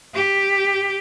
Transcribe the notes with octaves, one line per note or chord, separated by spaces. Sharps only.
G4